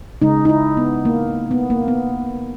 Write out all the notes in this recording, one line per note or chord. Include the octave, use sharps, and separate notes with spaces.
C#3 G#3 D#4
D#4
E4
B3
A#3
B3
A#3
B3